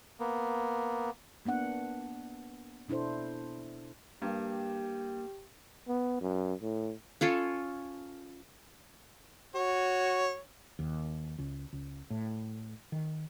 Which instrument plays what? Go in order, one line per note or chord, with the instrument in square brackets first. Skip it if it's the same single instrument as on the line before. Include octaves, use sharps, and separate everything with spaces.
[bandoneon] A#3 B3
[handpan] A#3 B3 D4 F#5
B2 D4 E4 A4 C5
[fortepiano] G2 [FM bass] A#3 [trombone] G4
[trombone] B3
F#2
A2
[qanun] C#4 F4 A4 C#5
[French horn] F#4 [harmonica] C#5
[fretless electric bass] D#2
C#2
C#2
A2
D#3